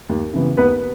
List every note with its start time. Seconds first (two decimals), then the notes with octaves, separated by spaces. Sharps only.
0.09 D#2
0.33 C#3 E3 B3
0.57 D#2 B3 B4